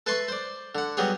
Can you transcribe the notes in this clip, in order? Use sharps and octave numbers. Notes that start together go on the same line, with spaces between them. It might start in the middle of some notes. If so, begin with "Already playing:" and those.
A4 B4 E5 A5 C6 C#6
C5 D5
D3 F#5
F#3 G3 B3 G#4 C#5